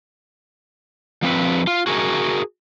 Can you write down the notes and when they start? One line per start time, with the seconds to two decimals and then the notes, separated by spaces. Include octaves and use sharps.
1.23 F3 C4 B4
1.67 F4
1.87 F#4 G#4 A#4